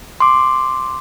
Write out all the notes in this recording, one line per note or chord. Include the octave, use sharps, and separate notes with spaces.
C6 D6